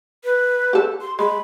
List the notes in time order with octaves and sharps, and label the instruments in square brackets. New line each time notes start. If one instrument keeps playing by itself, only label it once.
[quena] B4
[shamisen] G4 A4
[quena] C6
[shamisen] G#3 [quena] B5